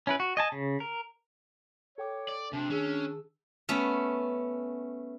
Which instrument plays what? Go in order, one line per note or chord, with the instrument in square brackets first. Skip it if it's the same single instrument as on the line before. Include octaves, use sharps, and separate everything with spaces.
[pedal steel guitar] C#4 E4 B4
F#4
D#5 G#5 A5
C#3
A#4
[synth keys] A4 G5 D6 [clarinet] C#5
[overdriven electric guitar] D5
[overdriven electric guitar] C3 [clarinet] D4
[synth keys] D#3 G#4 E6 [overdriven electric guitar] C#4
[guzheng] A3 B3 C#4